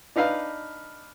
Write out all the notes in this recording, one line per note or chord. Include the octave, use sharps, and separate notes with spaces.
D4 D#4 B4 F5